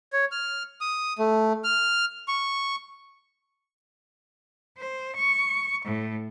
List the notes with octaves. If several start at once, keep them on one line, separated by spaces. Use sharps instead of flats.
C#5
F6
D#6
A3
F6
C#6
C5
C#6
A2